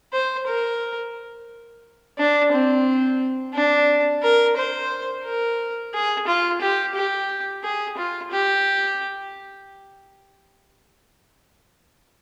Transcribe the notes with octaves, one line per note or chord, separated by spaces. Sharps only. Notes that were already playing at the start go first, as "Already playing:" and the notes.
C5
A#4
D4
C4
D4
A#4
C5
A#4
G#4
F4
G4
G4
G#4
F4
G4